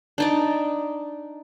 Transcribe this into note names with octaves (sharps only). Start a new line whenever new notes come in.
D4 D#4 D5